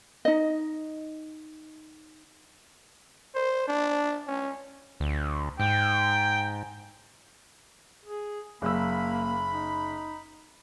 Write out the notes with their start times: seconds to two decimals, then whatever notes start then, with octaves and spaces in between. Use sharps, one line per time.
0.25 D#4 D#5
3.35 C5
3.68 D4
4.27 C#4
5.00 D2
5.60 G#2 G5
8.05 G#4
8.62 F#1 A#3 B5 E6
9.50 D#4